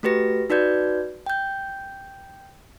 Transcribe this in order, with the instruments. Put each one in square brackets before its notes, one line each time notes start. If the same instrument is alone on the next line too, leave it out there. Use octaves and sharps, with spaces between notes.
[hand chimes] A3 F#4 G4 B4 A#6
D#4 F#4 B4 D5 G6 G#6
G5 G6